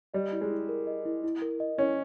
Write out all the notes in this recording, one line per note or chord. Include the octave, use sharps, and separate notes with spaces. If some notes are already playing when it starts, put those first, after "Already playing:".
G3 D#5
E4
G#3
E4
A#4
D#5
E4
E4
A#4
D#5
C#4 E4